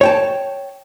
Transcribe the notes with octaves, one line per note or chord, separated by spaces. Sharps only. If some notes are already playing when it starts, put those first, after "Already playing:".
C#5 G5 A5